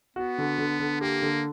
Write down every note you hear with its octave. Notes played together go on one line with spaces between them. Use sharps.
B3 F#4
D3
D3
D3
A#3 G4
D3